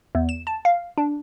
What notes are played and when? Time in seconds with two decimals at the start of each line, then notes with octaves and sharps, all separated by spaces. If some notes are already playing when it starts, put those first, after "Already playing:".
0.15 E2
0.29 E7
0.47 A5
0.65 F5
0.98 D4